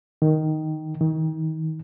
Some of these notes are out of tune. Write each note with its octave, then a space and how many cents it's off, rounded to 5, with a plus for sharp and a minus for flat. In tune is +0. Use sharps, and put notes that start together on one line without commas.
D#3 +0
D#3 +30